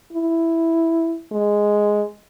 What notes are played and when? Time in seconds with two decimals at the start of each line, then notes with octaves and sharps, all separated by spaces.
0.13 E4
1.32 G#3